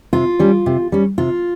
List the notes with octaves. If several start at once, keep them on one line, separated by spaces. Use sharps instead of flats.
C3 F4
G3 C#4
C3
G3 C#4
C3 F4